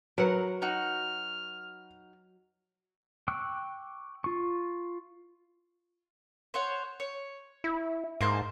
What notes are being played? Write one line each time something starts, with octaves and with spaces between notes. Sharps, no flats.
F#3 A#4 B4 F#5
D#4 F#4 F6
G5 C#6 D6 E6 F#6
F4 C#6
C5 C#5 F#5
C#5
E4
G#2 A#3 C5 A5